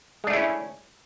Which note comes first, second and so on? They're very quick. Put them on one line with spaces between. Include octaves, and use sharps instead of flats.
G#3 D4 A3 E4 C#4